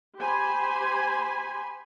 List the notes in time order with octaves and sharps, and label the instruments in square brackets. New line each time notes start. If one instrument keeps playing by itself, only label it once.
[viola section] G4 C5 G#5 B5 C6